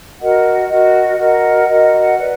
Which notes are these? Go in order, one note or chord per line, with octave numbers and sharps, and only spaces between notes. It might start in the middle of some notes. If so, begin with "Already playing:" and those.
F#4 A#4 D#5 F#5
F#4 A#4 D#5 F#5
F#4 A#4 D#5 F#5
F#4 A#4 D#5 F#5
B4 D5